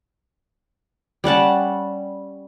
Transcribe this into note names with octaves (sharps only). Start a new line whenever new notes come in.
G3 C#4 F#5 A5